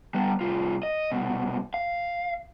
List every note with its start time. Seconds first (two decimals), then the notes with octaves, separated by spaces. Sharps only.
0.14 G3 B3
0.41 C2 F4
0.83 D#5
1.12 C2 B2
1.74 F5